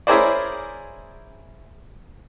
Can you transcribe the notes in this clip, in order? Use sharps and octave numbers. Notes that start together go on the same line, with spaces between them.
C#4 E4 G#4 A#4 C5 D5